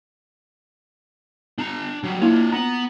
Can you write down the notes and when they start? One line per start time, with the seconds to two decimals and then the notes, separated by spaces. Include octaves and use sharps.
1.58 D4 A#5
2.03 F#3 G3
2.22 A#3 D4 E4 F4 C#5
2.52 B3 A#5